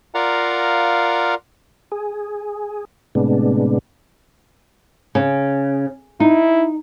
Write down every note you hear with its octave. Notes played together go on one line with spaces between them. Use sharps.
F4 A#4 D5 F5 F#5 A#5
G#4
A2 C3 G#3 B3 D4
C#3
D#4 E4